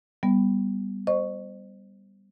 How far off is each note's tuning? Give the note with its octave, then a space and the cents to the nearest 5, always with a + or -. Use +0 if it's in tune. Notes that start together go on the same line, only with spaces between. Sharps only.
G3 +5 B3 +0
C5 +0 D#5 -35 C#6 +0